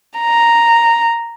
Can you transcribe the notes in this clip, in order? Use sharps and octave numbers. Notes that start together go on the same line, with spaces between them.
A#5